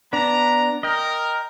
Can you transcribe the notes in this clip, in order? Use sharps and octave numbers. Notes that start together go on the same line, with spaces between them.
B3 D4 D5 A#5
A#4 D#5 G5